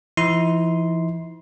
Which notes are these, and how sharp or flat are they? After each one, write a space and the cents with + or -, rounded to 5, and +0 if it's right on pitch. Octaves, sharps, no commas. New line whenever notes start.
E3 +40 E4 -45 C6 -5